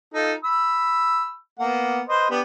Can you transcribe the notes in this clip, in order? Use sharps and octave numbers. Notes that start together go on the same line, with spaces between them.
D#4 F4 A4
B5 E6
A#3 B3 F#5
B4 C5 D#5
B3 D4 G4